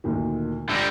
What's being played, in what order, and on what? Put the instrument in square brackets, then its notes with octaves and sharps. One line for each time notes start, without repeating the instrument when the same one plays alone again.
[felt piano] D2 A#2 D#3
[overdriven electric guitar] D3 G3 [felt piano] E6 A#6